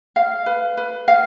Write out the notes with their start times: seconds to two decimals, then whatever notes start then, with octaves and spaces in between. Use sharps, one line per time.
0.16 F5
0.46 B4
0.77 B4
1.08 F5